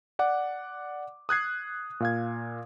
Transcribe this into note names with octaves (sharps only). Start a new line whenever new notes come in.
D5 F#5 D6
D#6 F#6 G#6 C7
A#2 F5 G#6